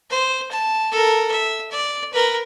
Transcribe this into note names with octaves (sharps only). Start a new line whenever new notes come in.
C5
A5
A4 A#4
E5
D5
A#4 B4